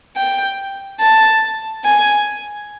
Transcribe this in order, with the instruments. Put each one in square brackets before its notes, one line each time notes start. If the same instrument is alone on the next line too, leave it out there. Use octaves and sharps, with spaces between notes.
[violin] G5
A5
G#5